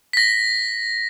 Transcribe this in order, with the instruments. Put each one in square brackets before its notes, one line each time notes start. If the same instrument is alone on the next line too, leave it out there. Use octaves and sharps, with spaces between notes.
[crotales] A#6 B6